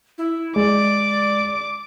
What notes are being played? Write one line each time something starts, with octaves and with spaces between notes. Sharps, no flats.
E4
G#3 D5 D6